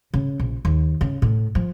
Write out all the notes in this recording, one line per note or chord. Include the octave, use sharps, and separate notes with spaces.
C#3
A#1
D#2
C#3
A2
F3